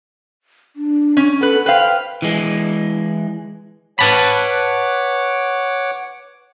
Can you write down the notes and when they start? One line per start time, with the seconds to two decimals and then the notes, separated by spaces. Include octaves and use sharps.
0.76 D4
1.17 C#4
1.41 B3 A4 B4
1.66 B4 C5 F5 G5
2.22 E3 G#3
3.99 B4 C#5 F#5 A5 B5 D6